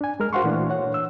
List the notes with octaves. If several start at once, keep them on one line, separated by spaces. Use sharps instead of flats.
D4 G#5
G#3 A#4 F6
F#4 C5 F5 F#5 C6 C#6
A#2 E3 A3 D4
C#5 F#5
E6